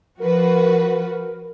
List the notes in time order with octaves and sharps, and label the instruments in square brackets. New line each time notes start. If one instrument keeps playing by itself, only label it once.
[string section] F3 F#4 B4 [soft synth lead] A#4